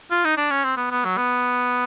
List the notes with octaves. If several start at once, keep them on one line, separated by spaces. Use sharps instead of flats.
F4
D#4
D4
C#4
C4
B3
B3
F#3
B3